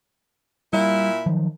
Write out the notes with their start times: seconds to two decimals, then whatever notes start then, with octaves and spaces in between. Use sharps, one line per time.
0.73 A#2 G3 E4
1.26 D#3 F3 F#3